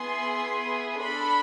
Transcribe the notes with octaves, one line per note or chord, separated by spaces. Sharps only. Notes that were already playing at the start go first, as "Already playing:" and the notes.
Already playing: B3 E4 G#4 C6
D4 A4 B5